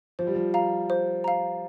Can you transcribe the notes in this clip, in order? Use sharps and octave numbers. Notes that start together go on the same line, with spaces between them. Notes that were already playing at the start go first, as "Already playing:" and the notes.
F3 C5
G3
F3
F5 A#5
C5
F5 A#5